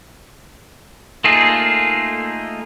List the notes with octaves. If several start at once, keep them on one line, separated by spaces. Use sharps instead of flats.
A3 A#3 D#4 F4 G#4